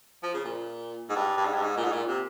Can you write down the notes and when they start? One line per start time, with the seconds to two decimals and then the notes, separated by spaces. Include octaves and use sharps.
0.23 F3
0.34 C#3
0.45 A#2
1.09 G#2
1.16 G2
1.37 G2
1.45 G#2
1.54 G2
1.62 G#2
1.77 A#2
1.84 G#2
1.92 A#2
2.08 C3